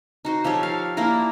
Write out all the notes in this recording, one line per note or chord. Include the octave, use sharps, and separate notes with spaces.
D#4 F#4 C5
F3 G4 A4 C#5
F5
A#3 D4 E4 A#4